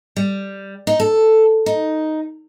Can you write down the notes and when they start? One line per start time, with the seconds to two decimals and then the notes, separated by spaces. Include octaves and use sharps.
0.17 G3
0.87 D#4
1.00 A4
1.66 D#4